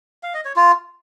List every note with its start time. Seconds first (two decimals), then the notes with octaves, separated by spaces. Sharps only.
0.23 F5
0.34 D#5
0.45 C#5
0.56 F4